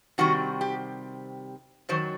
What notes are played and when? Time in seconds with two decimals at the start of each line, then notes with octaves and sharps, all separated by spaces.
0.18 C3 D#3 G3 C4 F#4
0.61 G4
1.89 F#2 D#3 F#3 C5